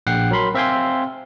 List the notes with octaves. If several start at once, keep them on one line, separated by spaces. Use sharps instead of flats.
A#1 F#5 G5 C7
F#3 A#4 B5 C6
C4 E5 F5 G5 G#5 C6